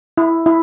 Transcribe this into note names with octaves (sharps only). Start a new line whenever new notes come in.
E4
E4